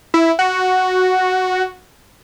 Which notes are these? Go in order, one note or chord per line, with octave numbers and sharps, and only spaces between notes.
E4
F#4